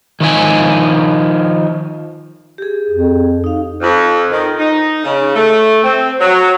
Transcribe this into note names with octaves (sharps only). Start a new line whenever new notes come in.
D#3 F3 D#5 G#5
G4 G#4
F2
D#4 F5
F2
D#3
D#4
C#3
A3
C4
F#3